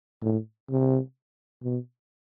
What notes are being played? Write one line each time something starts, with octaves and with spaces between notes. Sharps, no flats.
A2
C3
B2